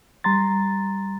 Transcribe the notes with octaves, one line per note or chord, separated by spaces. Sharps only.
G3 A#5 C6 A6